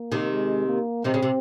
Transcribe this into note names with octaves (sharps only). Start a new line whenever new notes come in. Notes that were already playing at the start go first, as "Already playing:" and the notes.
Already playing: A#3
C3 D#3
G#3
A#3
C3 D#3 C4
C#3
C3